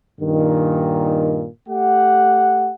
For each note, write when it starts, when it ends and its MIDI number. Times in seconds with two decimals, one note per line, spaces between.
0.21 1.47 43
0.21 1.47 46
0.21 1.47 51
1.69 2.72 57
1.69 2.72 67
1.69 2.72 78